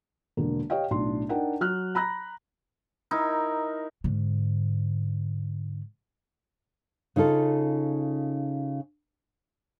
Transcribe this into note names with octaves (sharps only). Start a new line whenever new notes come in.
E1 D3 A#3
G4 C#5 D#5 F5 G5
B1 A2 D4 C6
D4 D#4 A#4 F#5 G5
F#3 F6 F#6
A#5 B5 F#6 A#6
D#4 E4 A#4
G#2 D3
C#3 D#4 F4 A4